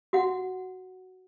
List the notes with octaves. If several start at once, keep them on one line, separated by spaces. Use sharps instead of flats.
F#4 F#5